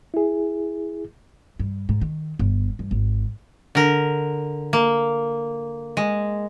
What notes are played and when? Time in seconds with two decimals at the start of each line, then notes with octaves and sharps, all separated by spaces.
0.14 E4 G#4
1.59 G2
1.89 G#2
2.01 D#3
2.39 G1
2.79 G2
2.91 G#1
3.75 D3 A#4
4.73 A#3
5.97 G#3